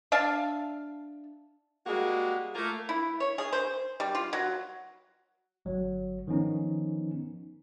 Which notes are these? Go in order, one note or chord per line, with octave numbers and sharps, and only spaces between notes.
D4 E5 F5 A5
G3 G#3 A#3 F#4
A3 A#3 F4 A#4
E4
C#5
G#4
C5
G3
F4
F#3
G1 F#3
D#3 F3 B3 C#4 D#4